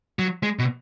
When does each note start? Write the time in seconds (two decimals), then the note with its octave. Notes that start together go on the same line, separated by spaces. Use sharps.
0.19 F#3
0.43 G#3
0.59 B2